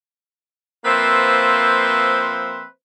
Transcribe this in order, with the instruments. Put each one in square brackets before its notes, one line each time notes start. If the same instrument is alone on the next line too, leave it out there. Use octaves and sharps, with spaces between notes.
[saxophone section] F3 A#3 C4 B4 C5 E5